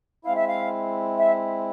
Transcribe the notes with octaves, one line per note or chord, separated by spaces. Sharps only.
G#3 C4 E4 F5
E5
F5
E5